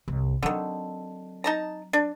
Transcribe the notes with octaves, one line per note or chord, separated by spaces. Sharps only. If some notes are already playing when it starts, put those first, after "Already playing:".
C2 F#2
D3 D#3 F#3 C4
D#4 A5 A#5
D4